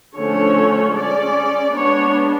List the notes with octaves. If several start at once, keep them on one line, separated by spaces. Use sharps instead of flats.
D3 F3 A3 C#4 C#5
G#3 C#4 D5
G#3 B3 D4 C#5